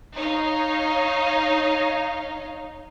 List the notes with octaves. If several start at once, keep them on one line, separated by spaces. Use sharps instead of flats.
D#4 C#5 D#5 F5